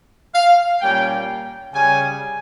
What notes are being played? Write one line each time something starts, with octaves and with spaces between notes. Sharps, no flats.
F5
A#2 G3 A#3 C#4 G5
C#3 G3 C#4 G#5